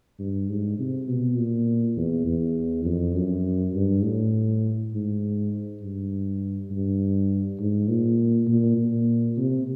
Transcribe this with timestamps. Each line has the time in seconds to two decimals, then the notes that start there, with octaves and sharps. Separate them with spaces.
0.19 G2
0.48 G#2
0.79 C3
1.08 B2
1.37 A#2
1.96 E2
2.27 E2
2.85 F2
3.15 F#2
3.74 G2
4.03 A2
4.93 G#2
5.81 G2
6.70 G2
7.59 G#2
7.88 A#2
8.47 A#2
8.77 A#2
9.37 C3